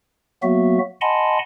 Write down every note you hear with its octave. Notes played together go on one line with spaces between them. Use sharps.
F#3 A#3 B3 F#4 E5
D#5 F#5 G#5 A5 B5 C6